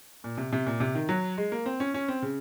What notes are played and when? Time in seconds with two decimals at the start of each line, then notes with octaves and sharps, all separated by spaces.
0.24 A#2
0.38 C3
0.53 C3
0.66 A#2
0.80 C3
0.95 D#3
1.09 F#3
1.38 G#3
1.52 A#3
1.66 C4
1.80 C#4
1.94 C#4
2.08 C4
2.22 C#3